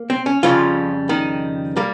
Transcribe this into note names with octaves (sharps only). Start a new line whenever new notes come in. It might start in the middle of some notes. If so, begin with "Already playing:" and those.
Already playing: A#3
C4
C#4
F2 C#3 F3 G3 F4
D#3 D#4
G3 A#3